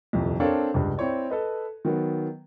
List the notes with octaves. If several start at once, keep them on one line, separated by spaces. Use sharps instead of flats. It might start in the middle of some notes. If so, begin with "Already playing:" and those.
D#1 C2 F2
C4 D4 A4 A#4 C#5 F5
C#2 G2
C4 E4 C#5 D5
A4 B4 D#5
D#3 F#3 B3